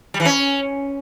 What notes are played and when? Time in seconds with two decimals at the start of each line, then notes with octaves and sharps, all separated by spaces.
0.14 G3
0.20 E3
0.25 C#4